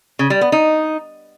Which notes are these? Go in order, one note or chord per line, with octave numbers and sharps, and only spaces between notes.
C#3
G3
B3
D#4